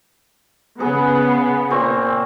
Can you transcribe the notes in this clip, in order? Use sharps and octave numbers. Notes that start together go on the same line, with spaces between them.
C#3 B3 G#4
A#2 C4 C#6